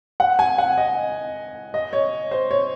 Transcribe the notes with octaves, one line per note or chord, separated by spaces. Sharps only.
F#5
G#5
F#5
D#5
D#5
C#5
C5
C#5